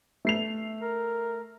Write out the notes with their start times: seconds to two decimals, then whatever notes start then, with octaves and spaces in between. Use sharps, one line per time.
0.25 A3 C7 F7
0.81 A#4